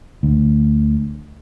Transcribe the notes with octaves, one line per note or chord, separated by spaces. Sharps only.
D2